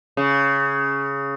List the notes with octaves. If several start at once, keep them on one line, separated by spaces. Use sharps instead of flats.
C#3